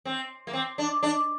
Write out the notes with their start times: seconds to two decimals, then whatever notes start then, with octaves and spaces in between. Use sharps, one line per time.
0.05 C4
0.47 A#3
0.53 C4
0.78 D4
1.03 D4